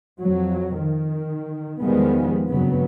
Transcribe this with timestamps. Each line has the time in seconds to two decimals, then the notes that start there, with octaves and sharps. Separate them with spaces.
0.19 F2 F#3
0.76 D#3
1.81 E2 D#3 F3 G3 G#3 B3
2.49 F#1 G2 C#3 F#3 B3